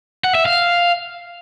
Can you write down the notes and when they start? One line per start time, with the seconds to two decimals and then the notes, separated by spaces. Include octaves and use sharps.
0.24 F#5
0.35 E5
0.46 F5